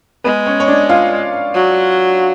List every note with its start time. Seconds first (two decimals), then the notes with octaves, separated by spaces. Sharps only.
0.24 G#3 B3 B4
0.46 C#4 C#5
0.60 C#5
0.68 D4 D5
0.89 F4 F5
1.55 F#3